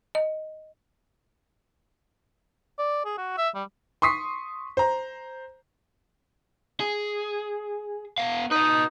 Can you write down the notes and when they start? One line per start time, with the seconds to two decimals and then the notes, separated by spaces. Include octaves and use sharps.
0.15 D#5
2.79 D5
3.05 G#4
3.18 F#4
3.38 E5
3.55 G3
4.02 C6 C#6 D#6 B6 C7
4.77 C5 A#5
6.80 G#4
8.18 B3 F5
8.51 D#4 B4 D#5